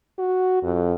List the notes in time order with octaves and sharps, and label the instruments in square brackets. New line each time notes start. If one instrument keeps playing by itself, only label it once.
[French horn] F#4
F2